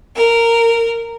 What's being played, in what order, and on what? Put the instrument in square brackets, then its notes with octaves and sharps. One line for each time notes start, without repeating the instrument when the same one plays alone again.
[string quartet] A#4